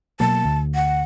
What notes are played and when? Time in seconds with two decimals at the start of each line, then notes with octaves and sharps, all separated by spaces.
0.20 B2 F#3 A#3 A5
0.44 D2
0.75 F#5